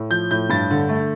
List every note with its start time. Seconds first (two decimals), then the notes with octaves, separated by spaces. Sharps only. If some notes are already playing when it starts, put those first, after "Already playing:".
Already playing: A2
0.10 F3 G6
0.31 A2 G6
0.50 G2 A6
0.70 D3
0.89 A3